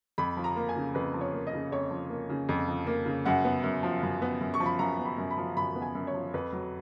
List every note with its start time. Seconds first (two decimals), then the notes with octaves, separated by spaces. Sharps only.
0.18 F2 B5
0.37 F3
0.44 A#5
0.56 A#3
0.69 G#5
0.76 C#3
0.95 F2 B4
1.14 F3
1.21 C#5
1.33 A#3
1.47 D#5
1.53 C#3
1.72 F2 C#5
1.91 F3
2.10 A#3
2.29 C#3
2.49 F2
2.68 F3
2.87 A#3
3.06 C#3
3.26 F#2 F#5
3.45 B3
3.64 F#2
3.83 F3
4.03 F#2
4.22 B3
4.41 F#2
4.54 C#6
4.60 F3
4.66 B5
4.79 F#2 A#5
4.99 B3
5.06 B5
5.18 F#2
5.31 B5
5.37 F3
5.57 F#2 B5
5.75 B3
5.82 G#5
5.95 F#2
6.07 C#5
6.14 F3
6.34 F2 B4
6.52 F#3